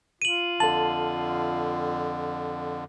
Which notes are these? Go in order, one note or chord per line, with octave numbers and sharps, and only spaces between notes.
F4 D#7 F#7
F2 D3 A4 A5 F#7